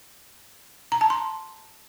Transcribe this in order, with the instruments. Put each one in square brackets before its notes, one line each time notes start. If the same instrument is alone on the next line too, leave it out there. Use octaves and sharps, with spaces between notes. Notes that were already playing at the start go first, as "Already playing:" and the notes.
[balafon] A#5
A5
C6